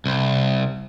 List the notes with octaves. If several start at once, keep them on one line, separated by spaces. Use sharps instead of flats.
C2